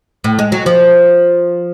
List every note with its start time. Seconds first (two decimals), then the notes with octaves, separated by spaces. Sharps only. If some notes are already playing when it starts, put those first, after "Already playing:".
0.24 A2
0.39 G#3
0.52 F#3
0.66 F3